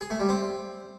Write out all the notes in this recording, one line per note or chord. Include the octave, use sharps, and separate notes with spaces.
G#4
A3
G3
C4